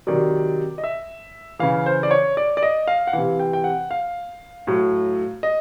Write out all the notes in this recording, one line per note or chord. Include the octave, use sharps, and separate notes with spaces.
C3 D#3 F#3 D5
D#5
E5
C#3 E3 F5
C5
D5
C#5
D5
D5
D#5
F5
F#5
C3 E3 F5
G5
G5
F#5
F5
A2 F#3
D#5